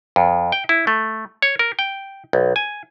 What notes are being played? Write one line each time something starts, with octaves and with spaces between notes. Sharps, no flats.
F2
G5
E4
A3
C#5
A#4
G5
B1
G#5